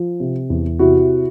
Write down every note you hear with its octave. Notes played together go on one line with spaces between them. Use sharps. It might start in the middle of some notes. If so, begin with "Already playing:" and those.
Already playing: F3
C3
E2
C3 E4 F#4